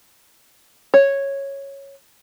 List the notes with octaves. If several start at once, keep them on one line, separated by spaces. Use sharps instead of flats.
C#5